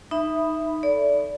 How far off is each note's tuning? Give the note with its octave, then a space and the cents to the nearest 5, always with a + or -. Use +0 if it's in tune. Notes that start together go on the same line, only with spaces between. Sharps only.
D#4 -5 E5 +0 B5 +0
A4 +0 D5 -30